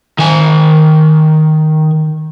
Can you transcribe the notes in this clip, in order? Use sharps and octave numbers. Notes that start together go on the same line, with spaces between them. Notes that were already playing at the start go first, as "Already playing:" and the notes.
D#3 G#5